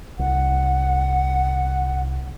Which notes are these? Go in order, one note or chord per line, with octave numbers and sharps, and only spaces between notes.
C2 F#5